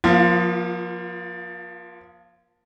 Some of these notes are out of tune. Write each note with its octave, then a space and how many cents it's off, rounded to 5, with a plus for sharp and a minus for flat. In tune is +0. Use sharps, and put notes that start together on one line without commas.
F3 +25 A#3 +35 F4 -20